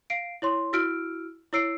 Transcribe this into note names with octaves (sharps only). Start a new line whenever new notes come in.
F5 C7 D7
E4 C#5 C6
E4 F#4 E6 F6 D7
E4 C#5 E6 C7 D7